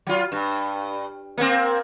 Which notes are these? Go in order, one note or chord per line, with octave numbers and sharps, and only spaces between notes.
F#3 F4
G2
A#3 C4